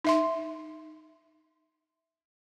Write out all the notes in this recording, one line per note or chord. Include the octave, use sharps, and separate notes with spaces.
D#4 E5 C6